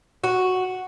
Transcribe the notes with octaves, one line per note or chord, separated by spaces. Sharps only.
F#4